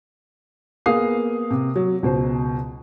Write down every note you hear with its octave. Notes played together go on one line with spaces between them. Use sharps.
A#3 B3 G#4 F5 D#6 C7
C3
F#3
C#2 B2 C5